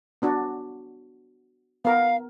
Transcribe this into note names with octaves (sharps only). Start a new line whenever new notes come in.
B3 D4 F#4
B3 A#4 F5